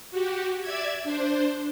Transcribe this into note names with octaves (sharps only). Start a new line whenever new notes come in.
F#4 G4
D5 E5 E6 G#6
D4 C5